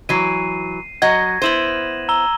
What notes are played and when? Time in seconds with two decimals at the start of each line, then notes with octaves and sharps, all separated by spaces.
0.09 E3 F#3 C7 D#7
1.02 F#3 D#5 F#5 G#6 A#6
1.42 B3 E4 C5 D#7 E7 F#7
2.09 A#5 E6 G7